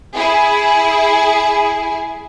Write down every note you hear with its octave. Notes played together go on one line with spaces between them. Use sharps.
E4 G#4